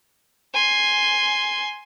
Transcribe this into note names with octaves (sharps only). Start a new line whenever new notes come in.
G#5 C6